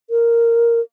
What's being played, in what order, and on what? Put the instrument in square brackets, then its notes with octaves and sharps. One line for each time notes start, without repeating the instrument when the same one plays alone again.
[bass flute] A#4